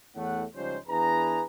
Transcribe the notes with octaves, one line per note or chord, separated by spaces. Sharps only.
E2 A2 A3 F#5
C#2 F3 G3 C#4 D#4 C5
E2 D4 E4 G#4 B4 A#5